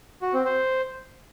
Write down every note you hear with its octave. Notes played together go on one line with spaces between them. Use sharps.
F#4
C4
C5